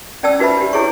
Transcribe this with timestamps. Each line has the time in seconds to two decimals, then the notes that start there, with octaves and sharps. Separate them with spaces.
0.23 C#4 D5 G5 A5 E6
0.39 D#4 F#4 B4 C5 E5 B5
0.57 D4 G4
0.73 D4 E4 G#4 C#5 C#6